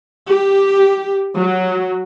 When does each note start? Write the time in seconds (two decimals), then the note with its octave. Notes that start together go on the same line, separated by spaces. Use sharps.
0.29 G4
1.37 F#3